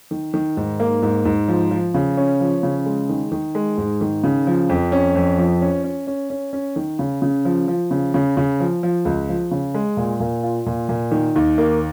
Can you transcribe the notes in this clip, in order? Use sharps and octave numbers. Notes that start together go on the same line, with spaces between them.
D#3
D#3
G#2
A#3
G#2
G#2
F3
F3
C#3
C#4
F3
C#3
G#3
D#3
D#3
G#3
G#2
D#3
C#3
F3
F2
C#4
F2
F3
C#4
C#4
C#4
C#4
C#4
D#3
C#3
C#3
F3
F3
C#3
C#3
C#3
F3
F3
C#2
F3
C#3
G#3
A#2
A#2
F4
A#2
A#2
D#3
D#2
A#3